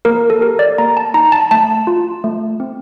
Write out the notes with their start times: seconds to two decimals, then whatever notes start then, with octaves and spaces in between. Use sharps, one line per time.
0.05 A#3 A#4
0.30 A4
0.41 G4 A#4
0.59 D5
0.78 A#3 A#5
0.97 A5
1.14 D#4 A#5
1.32 A5
1.51 A3 A5
1.87 F4
2.24 A3
2.60 C4